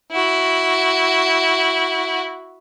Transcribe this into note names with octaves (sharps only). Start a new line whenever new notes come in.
E4 F#4